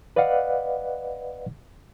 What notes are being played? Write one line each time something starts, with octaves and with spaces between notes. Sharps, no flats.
B4 D5 D#5 F5 F#5